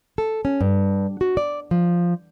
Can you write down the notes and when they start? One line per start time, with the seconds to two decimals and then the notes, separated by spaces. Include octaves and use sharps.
0.18 A4
0.45 C#4
0.61 G2
1.21 F#4
1.37 D5
1.71 F3